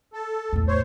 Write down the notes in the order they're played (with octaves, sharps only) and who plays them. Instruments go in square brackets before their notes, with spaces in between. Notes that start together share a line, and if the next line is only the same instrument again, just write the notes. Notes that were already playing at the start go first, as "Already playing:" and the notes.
[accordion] A4
[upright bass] E2 A2
[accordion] C5 C#5